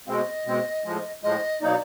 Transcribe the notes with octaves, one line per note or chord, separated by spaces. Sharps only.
B2 G#3 C4 D#5 F5
B2 G#3 C4
A2 F3 G#3
A2 F3 G#3 D#5
B2 F#3 A#3 D#4 D5